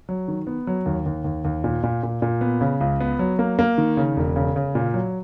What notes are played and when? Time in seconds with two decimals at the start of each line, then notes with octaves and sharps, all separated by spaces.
0.09 F#3
0.28 D#3
0.47 B3
0.67 F#3
0.86 D#2
1.06 D#2
1.24 D#2
1.45 D#2
1.64 A#2
1.83 A#2
2.03 A#2
2.22 A#2
2.41 B3
2.61 C#3
2.80 C#2
3.00 B3
3.19 F#3
3.39 A#3
3.59 A#3
3.78 D#3
3.97 C#3
4.17 E1
4.36 C#3
4.56 C#3
4.75 A#2
4.94 F#3